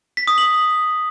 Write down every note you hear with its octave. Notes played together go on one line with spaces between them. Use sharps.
B6
D#6
F#7